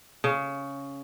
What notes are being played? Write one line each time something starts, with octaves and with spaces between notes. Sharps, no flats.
C#3